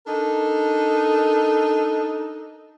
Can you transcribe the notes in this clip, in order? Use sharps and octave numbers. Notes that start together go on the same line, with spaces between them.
D4 D#4 A4 A#4